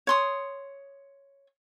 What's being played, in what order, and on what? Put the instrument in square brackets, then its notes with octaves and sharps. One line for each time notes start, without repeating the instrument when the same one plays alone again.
[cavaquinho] C#5 C6 D#6